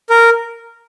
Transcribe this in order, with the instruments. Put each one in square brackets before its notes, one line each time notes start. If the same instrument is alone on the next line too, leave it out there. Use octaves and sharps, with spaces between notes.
[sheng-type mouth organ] A#4